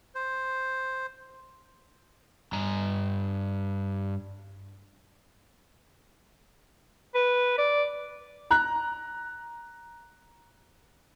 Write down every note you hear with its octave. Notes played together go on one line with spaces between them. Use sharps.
C5
G2 A#5
B4
D5
A#5 F#6